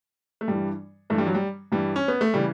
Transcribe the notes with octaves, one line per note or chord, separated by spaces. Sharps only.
A3
G2 E3 G3
G2 E3 A3
G3
F#3
G3
G2 E3 G3
C#4
B3
A3
C#3 E3 G3